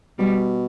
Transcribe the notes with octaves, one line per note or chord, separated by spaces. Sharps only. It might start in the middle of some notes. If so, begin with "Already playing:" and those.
B2 G3